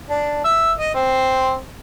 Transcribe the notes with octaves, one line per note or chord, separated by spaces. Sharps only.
D4
E5
D#5
C4